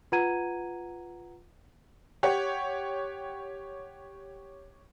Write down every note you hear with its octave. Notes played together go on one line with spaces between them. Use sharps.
F4 B4 F#5 A#5 G#6 D#7
G4 C#5 F#5